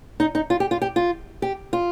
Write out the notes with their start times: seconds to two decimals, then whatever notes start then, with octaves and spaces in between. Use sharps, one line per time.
0.20 D#4
0.35 D#4
0.50 F4
0.60 G4
0.71 F4
0.82 G4
0.96 F4
1.42 G4
1.73 F4